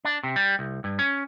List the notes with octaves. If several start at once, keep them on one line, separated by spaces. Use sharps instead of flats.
D4
C3
G3
C2
G2
C#4